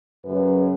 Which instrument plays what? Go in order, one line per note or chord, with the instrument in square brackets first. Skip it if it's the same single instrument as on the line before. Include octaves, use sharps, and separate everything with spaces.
[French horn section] F#2 C#3 F#3 B4